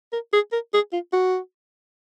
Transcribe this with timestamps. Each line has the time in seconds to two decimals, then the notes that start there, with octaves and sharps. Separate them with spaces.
0.13 A#4
0.33 G#4
0.52 A#4
0.73 G#4
0.92 F4
1.13 F#4